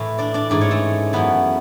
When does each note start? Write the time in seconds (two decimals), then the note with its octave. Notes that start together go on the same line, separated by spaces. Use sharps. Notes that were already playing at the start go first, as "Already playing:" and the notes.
Already playing: A2 E3 E4 E5
0.18 D4 D5
0.34 D4 D5
0.50 G#2 E3 D4 D5
0.61 C#4 C#5
0.71 A3 A4
1.13 F#2 E3 B3 B4